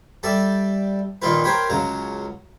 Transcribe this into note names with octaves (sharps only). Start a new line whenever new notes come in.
G3 A4 D5 E5
A#1 A#2 D#3 D#4 F4 B4
G4 A#4 C5 C#5 G5 B5
C#2 C#3 F#3 A#5